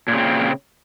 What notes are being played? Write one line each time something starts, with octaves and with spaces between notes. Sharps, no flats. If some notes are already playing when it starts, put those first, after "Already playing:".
A#2 C#3 C4